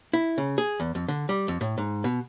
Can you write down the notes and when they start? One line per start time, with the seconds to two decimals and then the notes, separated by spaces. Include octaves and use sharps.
0.13 E4
0.38 C#3
0.58 G#4
0.80 E2
0.95 F2
1.08 D3
1.29 G3
1.48 F2
1.61 A2
1.78 G#2
2.04 B2